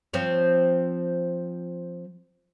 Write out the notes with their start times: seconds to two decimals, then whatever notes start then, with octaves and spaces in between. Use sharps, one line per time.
0.14 F3 C4 C#5